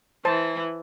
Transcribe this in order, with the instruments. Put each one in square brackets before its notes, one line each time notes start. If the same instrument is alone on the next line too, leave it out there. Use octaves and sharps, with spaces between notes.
[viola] E3 [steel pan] C5 A5